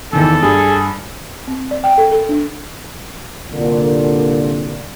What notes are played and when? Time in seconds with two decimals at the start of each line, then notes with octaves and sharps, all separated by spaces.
0.13 E2 D#3 E3 A4
0.42 G2 G#4
1.48 C4
1.71 D5
1.84 G5
1.98 A4
2.11 A4
2.29 D4
3.50 C2 A#2 D3